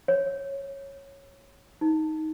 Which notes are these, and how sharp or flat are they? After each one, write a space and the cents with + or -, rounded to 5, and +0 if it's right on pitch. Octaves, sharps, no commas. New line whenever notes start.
C#5 -10
D#4 +15